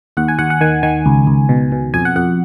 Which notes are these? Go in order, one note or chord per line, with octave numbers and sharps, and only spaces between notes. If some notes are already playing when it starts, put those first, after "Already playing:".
D#2 F#5
G#5
D#2 F#5
F#5
D#3 G#5
D#3 G#5
C#2
C#2
B2
B2
F2 G#5
F#5
F2 F#5